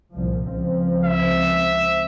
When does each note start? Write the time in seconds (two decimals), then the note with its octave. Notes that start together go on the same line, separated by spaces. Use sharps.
0.13 C2 A#2 F3
0.50 C#2 F3 C4
1.04 E5